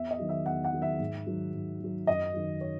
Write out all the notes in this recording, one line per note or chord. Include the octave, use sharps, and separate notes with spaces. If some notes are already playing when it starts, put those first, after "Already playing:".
Already playing: E2 E5
D#5
D#3 F#3
E5
E2 F#5
F#5
D#3 F#3
E5
G#2
D#3 F#3
G#2
D#3 F#3
F#2 D#5
D#3 F#3
C#5